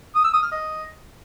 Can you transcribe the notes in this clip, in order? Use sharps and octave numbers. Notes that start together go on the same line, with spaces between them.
D#6
E6
D#6
F6
D#5